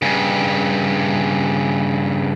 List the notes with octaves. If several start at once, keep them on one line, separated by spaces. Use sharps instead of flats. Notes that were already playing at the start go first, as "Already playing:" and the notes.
G2 C#3